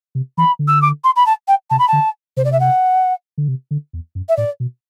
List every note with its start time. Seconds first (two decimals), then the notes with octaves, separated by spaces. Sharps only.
0.15 C3
0.37 E3 B5
0.59 D3
0.68 E6
0.82 D6
1.04 C6
1.16 B5
1.26 A5
1.48 G5
1.70 C3 A5
1.79 B5
1.88 D3 A5
2.37 C3 C5
2.45 D5
2.52 E5
2.60 F#5
3.38 D3
3.48 C3
3.71 D3
3.93 E2
4.15 F#2
4.29 E5
4.37 A2 D5
4.60 B2